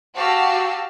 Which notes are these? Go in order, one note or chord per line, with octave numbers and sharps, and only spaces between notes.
F#4 G4 F5 A5 E6